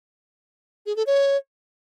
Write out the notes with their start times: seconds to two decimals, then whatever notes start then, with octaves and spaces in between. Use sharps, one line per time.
0.86 G#4
0.96 A4
1.07 C#5